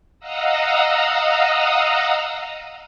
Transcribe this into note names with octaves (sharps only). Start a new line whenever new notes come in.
D#5 F5 F#5 A#5 D#6 E6